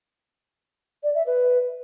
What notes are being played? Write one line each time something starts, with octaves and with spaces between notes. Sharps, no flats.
D5
E5
B4